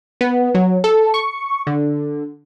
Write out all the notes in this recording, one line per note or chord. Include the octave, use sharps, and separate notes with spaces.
B3
F#3
A4
C#6
D3